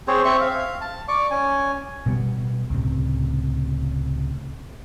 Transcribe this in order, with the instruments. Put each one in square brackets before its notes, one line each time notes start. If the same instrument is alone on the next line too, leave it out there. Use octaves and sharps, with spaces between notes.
[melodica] C4 G#4 C5 C#5
C4 E5 C#6
F5
A5
D5 C#6 D6
C#4 G#5
[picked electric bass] B2 G3 B3
C#2 A2 C3